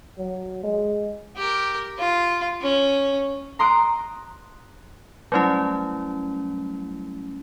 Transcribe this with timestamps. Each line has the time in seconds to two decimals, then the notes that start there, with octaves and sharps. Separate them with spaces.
0.18 F#3
0.64 G#3
1.37 G4 A#4
1.98 F4
2.62 C#4
3.59 A#5 C6 D#6 F#6 D7
5.32 F#3 G3 A3 C#4 E4